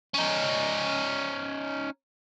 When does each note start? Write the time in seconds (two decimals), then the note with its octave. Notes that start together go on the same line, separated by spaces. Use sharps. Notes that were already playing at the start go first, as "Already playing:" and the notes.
0.14 C#4 D#4